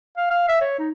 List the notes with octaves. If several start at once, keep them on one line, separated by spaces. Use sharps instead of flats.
F5
F5
E5
C#5
D#4